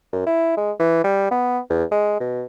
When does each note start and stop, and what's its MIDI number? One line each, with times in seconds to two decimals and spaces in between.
0.13 0.24 42
0.27 0.56 64
0.57 0.72 56
0.80 1.02 52
1.04 1.29 55
1.31 1.59 59
1.70 1.84 40
1.92 2.18 56
2.21 2.44 47